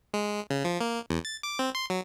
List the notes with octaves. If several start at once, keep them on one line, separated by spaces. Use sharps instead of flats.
G#3
C#3
F3
A#3
E2
A6
D6
C4
C6
F#3